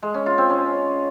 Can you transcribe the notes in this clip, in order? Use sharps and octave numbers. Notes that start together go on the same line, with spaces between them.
G#3
C#4
F4
C4
C#4